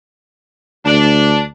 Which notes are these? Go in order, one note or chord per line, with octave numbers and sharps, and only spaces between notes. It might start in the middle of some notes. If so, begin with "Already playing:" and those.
D2 D4